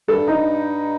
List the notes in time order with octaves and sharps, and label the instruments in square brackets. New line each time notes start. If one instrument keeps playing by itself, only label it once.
[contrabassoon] G2 [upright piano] A4
[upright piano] D#4